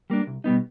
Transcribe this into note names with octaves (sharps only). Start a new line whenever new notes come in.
G3 A#3 D4
C2
B2 G3 B3 D#4